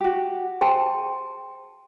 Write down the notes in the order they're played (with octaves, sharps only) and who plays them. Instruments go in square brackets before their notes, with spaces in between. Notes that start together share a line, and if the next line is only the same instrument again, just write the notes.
[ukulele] F#4 G4
[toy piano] G#4 G5 A5 [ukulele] C5